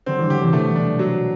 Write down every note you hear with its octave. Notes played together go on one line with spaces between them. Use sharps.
D3 F#3 C4
E3 G3
D3 F#3 G4
C3 E3
B2 D3 A3
D4
F#3